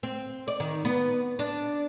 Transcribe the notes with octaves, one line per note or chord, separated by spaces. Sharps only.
C4
D5
D#3
B3
D4